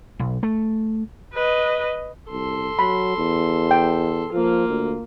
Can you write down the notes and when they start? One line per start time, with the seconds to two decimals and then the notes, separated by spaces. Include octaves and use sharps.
0.19 B1
0.43 A3
1.33 B4 D#5
2.31 C2 A4 C6
2.79 F#3 B5
3.18 E2
3.71 G5
4.33 F3 A#3 F4
4.69 D2